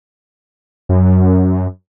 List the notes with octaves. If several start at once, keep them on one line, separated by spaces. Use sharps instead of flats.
F#2